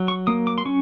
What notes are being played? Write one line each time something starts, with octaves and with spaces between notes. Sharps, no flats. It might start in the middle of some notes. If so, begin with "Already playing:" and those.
Already playing: F#3
C#6
A#3 D#6
D6
C6
C#4 C#6